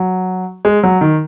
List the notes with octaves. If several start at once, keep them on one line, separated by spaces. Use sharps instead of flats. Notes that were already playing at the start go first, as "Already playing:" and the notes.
Already playing: F#3
G#3
F#3
D#3